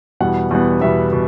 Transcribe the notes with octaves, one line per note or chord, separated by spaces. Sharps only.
E2 B2 G3 B3 F#5
E2 B2 G3 B3
E2 B2 G3 B3 E5
B2